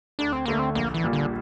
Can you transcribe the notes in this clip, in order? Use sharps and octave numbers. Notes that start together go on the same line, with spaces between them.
D2 D4
C4
D3 A3 A#3
C4
A#1 A#3
E3
A#2 G3 A#3
D3